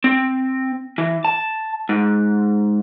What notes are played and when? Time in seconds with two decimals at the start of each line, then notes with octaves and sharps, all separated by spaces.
0.04 C4
0.98 E3
1.25 A5
1.89 G#2